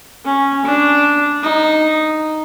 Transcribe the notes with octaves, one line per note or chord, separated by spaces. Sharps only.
C#4
D4
D#4